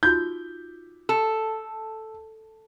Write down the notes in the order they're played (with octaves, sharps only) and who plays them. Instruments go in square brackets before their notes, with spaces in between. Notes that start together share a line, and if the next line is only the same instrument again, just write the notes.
[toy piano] D#4 F4 F#4 [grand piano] G6
[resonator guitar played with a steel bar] A4